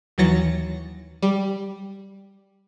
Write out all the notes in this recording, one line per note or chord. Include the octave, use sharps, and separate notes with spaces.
D#2 E3 F#3 A6 A#6 C#7
G3